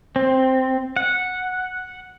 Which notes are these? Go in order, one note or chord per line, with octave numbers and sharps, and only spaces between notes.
C4
F#5